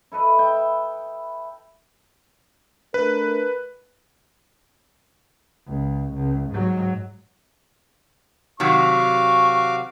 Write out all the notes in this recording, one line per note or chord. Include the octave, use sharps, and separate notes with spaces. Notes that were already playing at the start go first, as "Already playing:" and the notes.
E4 A4 B4 D#5
E5 G5
A3 D4 A#4 B4
C#2
C#2
G#2 F#3
C3 D#3 F#3 F#4 F5 C#6 D6